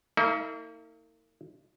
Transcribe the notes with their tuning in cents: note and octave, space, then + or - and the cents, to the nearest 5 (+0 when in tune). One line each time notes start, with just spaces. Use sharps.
A#3 -40 D#4 +45 A#4 +0